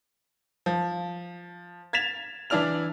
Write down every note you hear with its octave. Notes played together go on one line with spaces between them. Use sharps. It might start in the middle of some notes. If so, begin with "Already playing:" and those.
F3
G#6 A6 B6 E7 F7
E3 D4 E4 D5 F6 F7